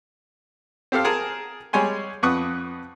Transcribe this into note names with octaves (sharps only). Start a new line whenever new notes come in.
C4 G4 A4 F5
G#4 A#4 G#5 A5
G3 G#3 C#5 G#5 C6
F2 B4 F#5 C#6 D#6